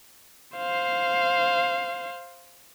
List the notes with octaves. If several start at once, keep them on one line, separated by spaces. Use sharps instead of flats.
C5 F5